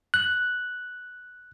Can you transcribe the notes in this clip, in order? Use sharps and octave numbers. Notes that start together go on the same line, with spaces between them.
F#6